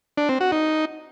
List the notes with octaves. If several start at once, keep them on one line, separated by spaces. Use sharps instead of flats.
D4
C4
F#4
D#4